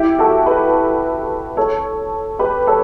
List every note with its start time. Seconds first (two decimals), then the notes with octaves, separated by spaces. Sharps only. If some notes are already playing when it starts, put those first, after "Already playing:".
Already playing: E4 G4
0.18 F#4 A4
0.46 G4 B4
1.57 A4 C#5
2.39 G4 B4
2.67 A4 C#5